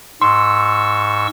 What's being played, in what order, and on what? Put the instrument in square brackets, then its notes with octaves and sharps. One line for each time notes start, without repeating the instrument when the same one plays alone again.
[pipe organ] G#2 C#6 E6 [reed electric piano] C6